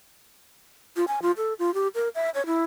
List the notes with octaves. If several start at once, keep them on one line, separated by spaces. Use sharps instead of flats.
F4
G#5
F4
A4
F4
G4
A#4
E5
C#5
E4